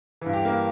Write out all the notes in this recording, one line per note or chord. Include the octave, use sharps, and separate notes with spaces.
G2 E3
G4
A#3